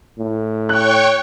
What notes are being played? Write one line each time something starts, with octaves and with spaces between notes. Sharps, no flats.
A2
C#5 G5 C#6 F#6